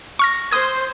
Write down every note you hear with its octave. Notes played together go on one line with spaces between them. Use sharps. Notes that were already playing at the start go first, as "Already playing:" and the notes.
C#6 F6 A#6
C5 D#6 G#6